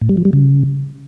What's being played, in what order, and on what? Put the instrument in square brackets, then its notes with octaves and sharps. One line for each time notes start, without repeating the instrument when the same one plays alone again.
[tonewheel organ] A2
G3
F3
G3
C#3